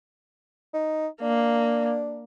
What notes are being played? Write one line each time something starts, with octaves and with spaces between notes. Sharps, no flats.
D#4
A#3 D4